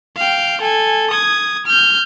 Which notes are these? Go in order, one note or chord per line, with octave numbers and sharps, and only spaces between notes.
F5 G5
A4 G#5
D#6 G#6
F6 G6